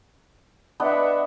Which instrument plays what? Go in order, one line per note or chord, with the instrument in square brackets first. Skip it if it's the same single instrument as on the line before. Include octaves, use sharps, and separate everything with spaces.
[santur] B3 D4 D#5 [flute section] B4 E5 F#5